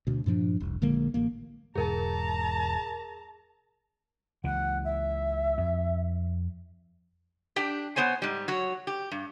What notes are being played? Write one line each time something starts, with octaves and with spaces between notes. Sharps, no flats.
D2 B2
G2 A#2 F3 D4
F1 C2
A#1 D3 G#3 A#3
A1 A#3
E1 G#2 G#4 A#4 A5 A#5
C#2 E3 F#5
E5
F2
D4 G4 G5
B3 C5 C#5 G#5
G#2 G3
F#3 C#5
G4
G2